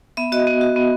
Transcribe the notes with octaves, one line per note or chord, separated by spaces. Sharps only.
B3 E5
F#4 D#5
B3
F#4
B3